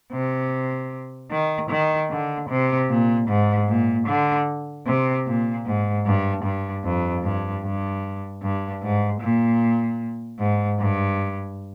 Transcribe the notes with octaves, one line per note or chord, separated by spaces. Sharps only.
C3
D#3
D#3
D3
C3
A#2
G#2
A#2
D3
C3
A#2
G#2
G2
G2
F2
G2
G2
G2
G#2
A#2
G#2
G2